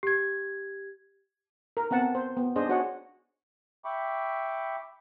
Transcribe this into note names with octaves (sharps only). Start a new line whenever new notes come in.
G4 G#6
A#4
B3 C4 F#5 A5
C5
B3
D4 D#4 G#4 C5 D#5
D4 F#4 C#5 D5 F#5 G#5
E5 G5 B5 C#6 D6